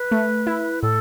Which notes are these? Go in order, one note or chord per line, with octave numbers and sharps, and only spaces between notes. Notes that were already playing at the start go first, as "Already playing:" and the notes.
Already playing: B4
A3
E4
A2 A4